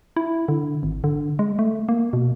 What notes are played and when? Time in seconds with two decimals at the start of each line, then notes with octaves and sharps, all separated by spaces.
0.16 E4
0.48 D3
0.83 G#1
1.04 D3
1.39 G#3
1.59 A3
1.89 A#3
2.13 B2